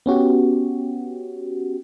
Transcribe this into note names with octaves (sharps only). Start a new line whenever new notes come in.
B3 C#4 F#4 G4